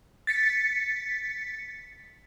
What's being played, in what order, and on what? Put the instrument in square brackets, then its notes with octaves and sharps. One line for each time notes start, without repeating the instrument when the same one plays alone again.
[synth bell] A6 B6 C#7